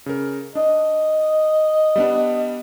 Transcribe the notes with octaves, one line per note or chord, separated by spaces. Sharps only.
C#3 A#4
D4 D#5
G3 B3 D4